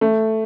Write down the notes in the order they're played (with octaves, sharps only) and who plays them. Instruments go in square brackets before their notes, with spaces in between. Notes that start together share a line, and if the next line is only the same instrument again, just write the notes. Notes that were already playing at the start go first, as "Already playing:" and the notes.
[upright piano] A3